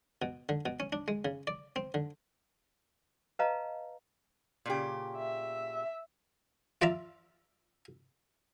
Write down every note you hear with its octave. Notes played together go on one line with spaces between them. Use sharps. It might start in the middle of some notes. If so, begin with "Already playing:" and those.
B2
D3
B2
C#4
D4
G#3
C#3
D5
C4
D3
B4 D#5 F5 A5 A#5
A#2 C#3 G4
E5
F4 D5 E5 A#5